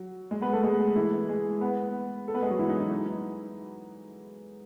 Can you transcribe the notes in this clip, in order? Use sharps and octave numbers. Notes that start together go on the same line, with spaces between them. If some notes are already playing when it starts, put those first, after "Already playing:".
Already playing: F#3
G#3 G#4
B3 B4
A3 A4
G#3 G#4
E3 E4
G#3 G#4
B3 B4
A4
B3 B4
G#3 G#4
F#3 F#4
E3 E4
D#4
D#4
D#4